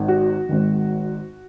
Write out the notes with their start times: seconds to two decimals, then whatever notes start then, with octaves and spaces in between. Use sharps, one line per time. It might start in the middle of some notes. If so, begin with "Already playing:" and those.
Already playing: G#1 G#2 D#3
0.08 F#4
0.49 G#1 G#2 D#3